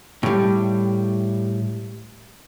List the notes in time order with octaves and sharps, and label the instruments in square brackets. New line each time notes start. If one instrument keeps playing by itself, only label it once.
[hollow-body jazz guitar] A2 G3